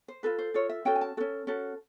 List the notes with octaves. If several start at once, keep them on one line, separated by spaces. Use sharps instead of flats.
C5
F4 A4 B4
C5
F4 A4 C#5
E5
C#4 F#4 A4 G5
G#5
A5
C#4 F#4 A4
C#4 F#4 A4